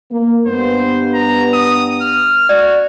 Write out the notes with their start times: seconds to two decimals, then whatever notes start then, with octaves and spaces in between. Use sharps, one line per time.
0.11 A#3
0.47 G2 B3 C5
1.14 A#5
1.53 D#6
2.01 F6
2.49 F#4 D5